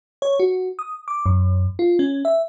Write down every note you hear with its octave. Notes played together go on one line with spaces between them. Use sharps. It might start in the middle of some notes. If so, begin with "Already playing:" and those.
C#5
F#4
D#6
D6
F#2
F4
C#4
E5